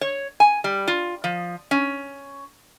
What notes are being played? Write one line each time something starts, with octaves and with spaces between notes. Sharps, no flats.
C#5
G#5
G3
F4
F3
C#4